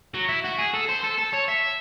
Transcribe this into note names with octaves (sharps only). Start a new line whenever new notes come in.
F#3
E4
F#4
G#4
A4
C5
A4
A4
C#5
E5